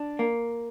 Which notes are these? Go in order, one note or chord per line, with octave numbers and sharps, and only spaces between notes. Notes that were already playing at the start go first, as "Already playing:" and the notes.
Already playing: D4
A#3